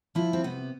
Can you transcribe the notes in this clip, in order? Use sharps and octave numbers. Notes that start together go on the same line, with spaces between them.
F3 E4
C4
C3 B3